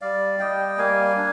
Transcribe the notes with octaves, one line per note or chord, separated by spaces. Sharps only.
G3 D5 F5
G3 D#5 G5
A#3 F5 G#5
D4